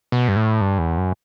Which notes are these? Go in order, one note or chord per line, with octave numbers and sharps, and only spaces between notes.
B2
G2
A2
G2
E2
F#2